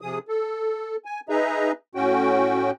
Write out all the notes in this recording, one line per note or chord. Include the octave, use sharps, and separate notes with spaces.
C3 F3 G#4 D#6
A4
G#5
D#4 G#4 B4 D#5 E5 A#5
A2 C#4 F#4 G5